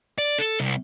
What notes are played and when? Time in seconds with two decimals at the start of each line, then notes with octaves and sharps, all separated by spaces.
0.18 D5
0.39 A4
0.60 C2